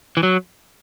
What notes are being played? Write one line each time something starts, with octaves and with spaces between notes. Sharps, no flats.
E3
F#3